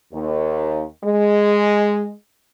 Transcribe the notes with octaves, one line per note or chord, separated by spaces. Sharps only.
D#2
G#3